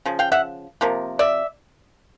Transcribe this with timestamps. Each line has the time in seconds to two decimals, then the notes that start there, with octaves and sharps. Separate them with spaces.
0.05 C#3 F3
0.19 F5 G5
0.32 E5 F#5
0.81 C3 F3 A#3
1.19 D5 E5